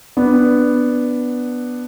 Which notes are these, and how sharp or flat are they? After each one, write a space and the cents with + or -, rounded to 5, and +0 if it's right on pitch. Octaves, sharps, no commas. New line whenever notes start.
B3 +0 D4 +0